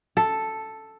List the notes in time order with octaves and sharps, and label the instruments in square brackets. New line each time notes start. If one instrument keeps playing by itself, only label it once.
[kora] A4